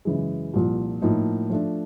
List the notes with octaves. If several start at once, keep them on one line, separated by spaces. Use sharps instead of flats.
F#2 C#3 E3 G#3
C2 A#2 F3
A2 F3 A#3 D#4
F3 A3 D4